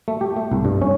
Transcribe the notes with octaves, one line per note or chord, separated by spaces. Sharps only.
A3
G4
A3
C2
G2
C#4